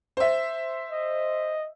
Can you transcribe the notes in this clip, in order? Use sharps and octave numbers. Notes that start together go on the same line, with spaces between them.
C5 E5
D#5